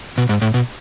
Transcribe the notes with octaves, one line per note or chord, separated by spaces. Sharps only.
B2
G#2
A2
B2